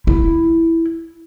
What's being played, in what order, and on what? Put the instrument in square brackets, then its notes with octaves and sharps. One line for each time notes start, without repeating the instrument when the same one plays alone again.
[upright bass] E4